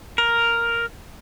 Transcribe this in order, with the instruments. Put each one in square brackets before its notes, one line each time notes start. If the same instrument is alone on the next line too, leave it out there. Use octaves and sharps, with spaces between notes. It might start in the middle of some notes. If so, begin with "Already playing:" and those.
[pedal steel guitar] A#4